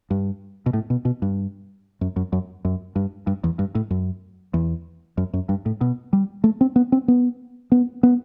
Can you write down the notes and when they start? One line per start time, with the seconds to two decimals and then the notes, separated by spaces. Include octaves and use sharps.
0.11 G2
0.66 B2
0.73 A2
0.90 B2
1.05 B2
1.22 G2
2.01 F#2
2.16 F#2
2.33 F#2
2.65 F#2
2.96 G2
3.27 G2
3.44 E2
3.59 G2
3.75 A2
3.91 F#2
4.54 E2
5.18 F#2
5.33 F#2
5.49 G2
5.66 A2
5.81 B2
6.13 G3
6.44 A3
6.61 C4
6.76 B3
6.92 C4
7.08 B3
7.72 B3
8.03 B3